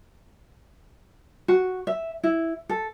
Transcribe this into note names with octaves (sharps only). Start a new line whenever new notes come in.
F#4
E5
E4
A4